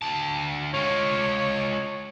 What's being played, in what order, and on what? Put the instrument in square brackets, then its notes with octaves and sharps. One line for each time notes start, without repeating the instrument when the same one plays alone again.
[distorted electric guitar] D2 A5
[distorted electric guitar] G#3 F4 [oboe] C#5